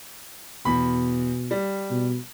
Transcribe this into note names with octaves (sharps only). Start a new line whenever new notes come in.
E2 B2 B5
G3
B2